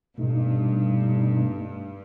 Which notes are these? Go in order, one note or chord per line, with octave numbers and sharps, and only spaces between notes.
G2 B2 A3 D#4